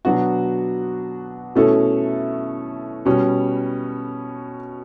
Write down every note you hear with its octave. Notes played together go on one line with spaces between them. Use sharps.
B2 F#3 B3 D4 F#4
B2 A3 C#4 E4 A4
B2 G3 C#4